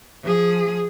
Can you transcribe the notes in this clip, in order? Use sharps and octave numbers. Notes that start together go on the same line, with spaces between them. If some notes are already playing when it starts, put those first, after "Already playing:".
F3 G#4